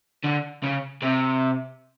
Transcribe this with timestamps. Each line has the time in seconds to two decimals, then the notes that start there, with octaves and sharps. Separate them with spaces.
0.24 D3
0.63 C#3
1.02 C3